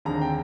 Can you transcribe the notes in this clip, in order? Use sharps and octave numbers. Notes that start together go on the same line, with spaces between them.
F1 D#2 D3 G#3 A#5
G5